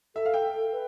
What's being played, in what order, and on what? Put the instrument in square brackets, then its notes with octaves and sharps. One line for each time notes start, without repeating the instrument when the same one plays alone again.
[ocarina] A4 [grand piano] E5
[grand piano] F5
G5
[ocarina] B4